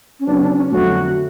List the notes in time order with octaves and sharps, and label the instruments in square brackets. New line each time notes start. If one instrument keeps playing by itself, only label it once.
[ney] C#4
[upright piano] C#3 F#3 B3 D#4 [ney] D4
[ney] C#4
D4
C#4
[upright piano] F2 D3 F#3 A3 [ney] F#4